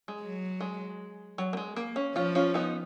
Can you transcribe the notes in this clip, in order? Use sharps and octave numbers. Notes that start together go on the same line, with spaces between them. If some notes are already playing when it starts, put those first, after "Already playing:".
G#3
F#3
G#3
F#3
A#3
G#3
A#3
C#4
F3 C#4 F4
C#4 F4
B3 D#4